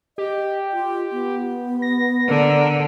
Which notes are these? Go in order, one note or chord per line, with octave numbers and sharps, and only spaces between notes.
G4 D#5
F4
B3
A#6
D3 A#4